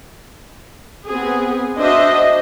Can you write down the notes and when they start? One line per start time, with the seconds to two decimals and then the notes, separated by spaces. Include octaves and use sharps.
1.07 B3 C4 G#4
1.76 D4 F#4 C5 D#5 E5